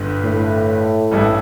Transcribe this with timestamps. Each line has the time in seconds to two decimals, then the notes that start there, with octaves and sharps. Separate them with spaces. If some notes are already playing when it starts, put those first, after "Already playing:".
Already playing: G1 G2 D3
0.23 A2
1.12 A1 G2 G3 E4 A4